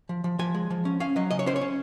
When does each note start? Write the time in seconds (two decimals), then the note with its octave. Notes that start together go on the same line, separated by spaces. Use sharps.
0.09 F3
0.24 F3
0.39 F3 G#5
0.54 G#3
0.70 F3
0.85 C#4
1.00 C#4 F5
1.16 F#3 D#5
1.31 C#3 D#5
1.39 C#5
1.46 C#4 C5
1.56 C#5
1.61 C#4